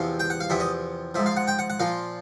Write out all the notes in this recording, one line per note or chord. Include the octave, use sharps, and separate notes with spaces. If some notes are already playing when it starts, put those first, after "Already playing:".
Already playing: E2 C3 F3 F5
G5
F#5
F5
E2 C3 F3 E5
D#5
G#2 F3 E5
F5
F#5
G5
F#5
F#5
A#2 F3 F5